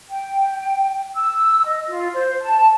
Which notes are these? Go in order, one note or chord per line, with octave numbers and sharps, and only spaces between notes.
G5
E6
D#5
F4
C5
A5